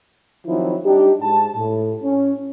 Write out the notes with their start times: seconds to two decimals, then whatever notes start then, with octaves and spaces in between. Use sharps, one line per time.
0.47 D#3 F3 F#3 C4 D#4 E4
0.84 G3 D4 D#4 G4
1.22 G#2 A5
1.56 A2
2.02 C#4